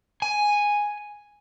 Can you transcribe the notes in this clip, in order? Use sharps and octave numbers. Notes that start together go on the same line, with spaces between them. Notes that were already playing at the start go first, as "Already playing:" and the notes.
G#5